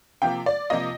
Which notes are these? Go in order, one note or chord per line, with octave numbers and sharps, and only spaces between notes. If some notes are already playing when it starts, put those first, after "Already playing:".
C3 F3 A#3 F4 G5
D5
C3 F3 A#3 F4 D#5